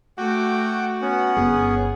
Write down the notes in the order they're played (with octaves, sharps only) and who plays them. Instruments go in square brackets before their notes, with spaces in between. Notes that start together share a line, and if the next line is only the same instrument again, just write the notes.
[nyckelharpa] A3 [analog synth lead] F#4 [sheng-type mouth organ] F#5 G5 D6
[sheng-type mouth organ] B3 C#4 [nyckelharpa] F#5
[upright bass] G1 [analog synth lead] G#4